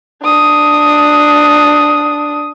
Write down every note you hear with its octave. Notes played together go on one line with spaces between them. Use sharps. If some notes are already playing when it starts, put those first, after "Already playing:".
D4 D#6